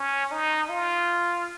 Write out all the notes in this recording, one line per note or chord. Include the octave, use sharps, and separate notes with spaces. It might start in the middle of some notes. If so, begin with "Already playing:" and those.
Already playing: C#4
D#4
F4